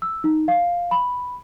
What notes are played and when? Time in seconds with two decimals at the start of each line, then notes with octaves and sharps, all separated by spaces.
0.02 E6
0.24 D#4
0.48 F5
0.91 B5